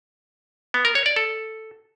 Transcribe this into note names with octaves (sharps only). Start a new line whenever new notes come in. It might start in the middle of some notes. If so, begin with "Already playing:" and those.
B3
A#4
C#5
D5
A4